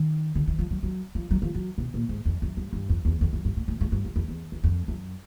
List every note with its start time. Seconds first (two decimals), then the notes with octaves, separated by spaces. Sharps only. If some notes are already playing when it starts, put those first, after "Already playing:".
Already playing: D#3
0.35 D3
0.48 E3
0.59 F3
0.71 F#3
0.83 F#3
1.15 F3
1.31 F#3
1.42 F3
1.55 F#3
1.78 B2
1.94 A#2
2.09 G#2
2.26 F2
2.42 F#2
2.57 G2
2.73 G2
2.89 F2
3.05 E2
3.21 F2
3.33 F#2
3.45 G2
3.57 A2
3.68 A2
3.81 G#2
3.92 G2
4.05 F#2
4.16 F2
4.28 E2
4.52 F2
4.64 F2
4.88 F#2